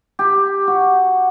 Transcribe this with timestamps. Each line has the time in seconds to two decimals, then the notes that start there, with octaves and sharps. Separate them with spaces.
0.19 G4
0.68 F#4